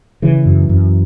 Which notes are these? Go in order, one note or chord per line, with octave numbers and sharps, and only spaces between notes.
C#3 E3
F#2
F#2